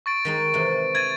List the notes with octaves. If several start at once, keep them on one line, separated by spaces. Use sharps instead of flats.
C#6 A6 D7
D#3 G#3 D#4
C3 E3 G#3
E4 G#6 A6 D#7